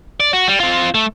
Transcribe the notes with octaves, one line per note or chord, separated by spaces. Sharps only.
D5
F#4
G3
C4 F4
A3